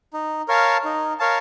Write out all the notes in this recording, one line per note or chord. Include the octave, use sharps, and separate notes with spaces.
D#4
A#4 C#5 F5 A5
D#4
A#4 C#5 F5 A5